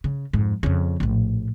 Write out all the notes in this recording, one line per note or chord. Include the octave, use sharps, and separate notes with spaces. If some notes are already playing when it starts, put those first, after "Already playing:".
C#3
F2 G#2
F2 C#3
A#1 A2